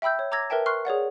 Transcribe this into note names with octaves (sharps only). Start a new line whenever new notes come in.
E5 G5 B5 E6 G6
C#5
A#5 D6 E6 G#6 A#6
A#4 B4 E5 G5 A5
C6 C#6 F6 F#6 C7
G#4 C#5 D5 F#5